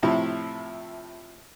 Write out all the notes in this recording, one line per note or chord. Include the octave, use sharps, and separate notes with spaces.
A2 C3 F3 E4